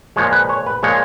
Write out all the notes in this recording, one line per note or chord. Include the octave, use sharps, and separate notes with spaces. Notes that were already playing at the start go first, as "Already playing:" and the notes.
A#2 F3 G#3 C#5
B4
C#5
B4
A#2 F3 G#3 C#5